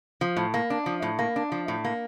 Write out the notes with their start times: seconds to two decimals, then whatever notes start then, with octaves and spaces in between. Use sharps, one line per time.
0.21 F3
0.37 A2
0.54 A#3
0.70 D4
0.86 F3
1.02 A2
1.19 A#3
1.36 D4
1.52 F3
1.68 A2
1.85 A#3